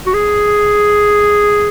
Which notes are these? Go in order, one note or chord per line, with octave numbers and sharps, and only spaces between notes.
F#4
G#4